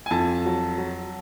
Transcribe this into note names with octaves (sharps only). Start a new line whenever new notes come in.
G#5
F2 A5
F#3
F#3